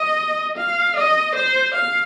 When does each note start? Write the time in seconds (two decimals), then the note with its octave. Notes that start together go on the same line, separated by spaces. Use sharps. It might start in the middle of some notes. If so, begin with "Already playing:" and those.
Already playing: D#5
0.58 F5
0.97 D#5
1.36 C5
1.75 F5